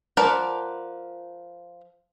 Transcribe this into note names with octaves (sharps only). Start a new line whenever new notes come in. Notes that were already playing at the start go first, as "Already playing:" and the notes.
F3 A#4 B4 D5 F#5